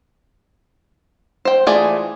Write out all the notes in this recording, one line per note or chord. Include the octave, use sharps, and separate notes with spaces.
C5 G5
E3 A3 F4 G#4 D5